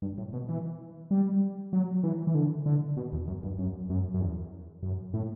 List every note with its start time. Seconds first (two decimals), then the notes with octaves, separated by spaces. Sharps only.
0.02 G2
0.18 A2
0.33 B2
0.49 E3
1.11 G3
1.73 F#3
2.03 E3
2.27 E3
2.35 D3
2.66 D3
2.97 B2
3.13 E2
3.28 F#2
3.43 G2
3.59 F#2
3.90 F#2
4.14 F#2
4.21 E2
4.83 F#2
5.14 A2